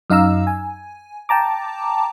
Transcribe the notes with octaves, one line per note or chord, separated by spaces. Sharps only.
F#2 D#4 F5 A#5 E6
G#5
G5 A5 A#5 D6